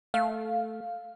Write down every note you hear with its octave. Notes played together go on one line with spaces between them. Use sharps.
A3 F5